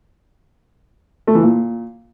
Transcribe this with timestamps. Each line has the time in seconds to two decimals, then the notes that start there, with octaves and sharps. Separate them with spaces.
1.27 A3
1.35 E3
1.43 A#2